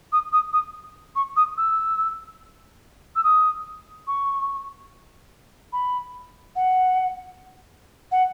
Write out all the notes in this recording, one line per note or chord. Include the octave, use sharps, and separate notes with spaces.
D#6
D#6
D#6
C#6
D#6
E6
E6
D#6
C#6
B5
F#5
F#5